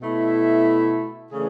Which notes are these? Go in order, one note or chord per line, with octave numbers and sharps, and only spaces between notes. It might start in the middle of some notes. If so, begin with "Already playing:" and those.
B2 A3 E4
C#3 E3 A3 D4 G#4